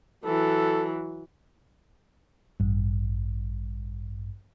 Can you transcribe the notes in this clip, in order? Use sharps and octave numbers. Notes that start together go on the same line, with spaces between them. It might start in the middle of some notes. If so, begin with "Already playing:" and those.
E3 F#3 A4
A1 G2